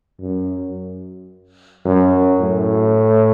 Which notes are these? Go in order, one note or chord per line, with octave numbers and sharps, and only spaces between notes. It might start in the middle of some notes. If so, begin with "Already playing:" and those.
F#2
F#2
A2